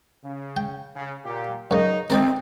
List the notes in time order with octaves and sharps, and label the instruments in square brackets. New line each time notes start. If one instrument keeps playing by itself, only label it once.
[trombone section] C#3
[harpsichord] G5
[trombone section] C#3
A#2 G4
[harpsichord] F#2 C#3 [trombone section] D#4
[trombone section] D2 C3 [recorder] C4 [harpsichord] D#4 A4 A#4